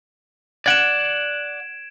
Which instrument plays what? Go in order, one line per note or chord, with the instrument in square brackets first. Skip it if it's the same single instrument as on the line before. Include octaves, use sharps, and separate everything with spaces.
[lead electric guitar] D5 F#5 [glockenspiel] G#6 D7 E7